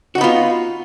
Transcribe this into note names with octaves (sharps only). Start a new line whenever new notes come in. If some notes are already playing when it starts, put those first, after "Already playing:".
B3 D#4 F4 F#4